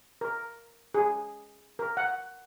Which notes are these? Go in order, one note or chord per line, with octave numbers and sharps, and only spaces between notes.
A#4
G#4
A#4
F#5